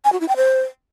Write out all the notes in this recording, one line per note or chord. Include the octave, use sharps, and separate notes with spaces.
G#5
F#4
E4
G5
C5